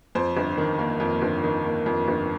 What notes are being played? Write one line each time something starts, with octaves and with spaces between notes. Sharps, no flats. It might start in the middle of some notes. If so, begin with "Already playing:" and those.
F2 C5
G1
D#3
A#3
F2
G1
D#3
A#3
F2
G1